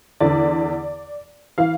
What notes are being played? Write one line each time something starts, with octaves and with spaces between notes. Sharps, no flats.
E2 D3 D5
E3 F5